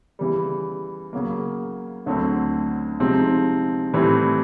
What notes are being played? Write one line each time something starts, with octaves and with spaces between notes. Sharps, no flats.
C#3 E3 G3
C#3 F#3 A#3
D2 D3 F#3 A3 C4
C3 F3 G#3 C4 D#4
A2 E3 G3 C4